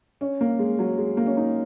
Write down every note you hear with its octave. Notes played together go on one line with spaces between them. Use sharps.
C#4
A#3
G#3
F#3
G#3
A#3
C#4
D#4